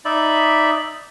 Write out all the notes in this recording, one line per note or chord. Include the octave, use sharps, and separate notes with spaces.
D#4 D5 E5 B5